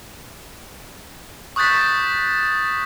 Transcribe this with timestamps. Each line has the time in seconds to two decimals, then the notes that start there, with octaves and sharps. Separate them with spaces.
1.56 C#6 D#6 F#6 G6 A6 B6